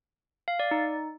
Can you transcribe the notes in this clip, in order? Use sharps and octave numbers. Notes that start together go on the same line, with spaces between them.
F5
D5
D#4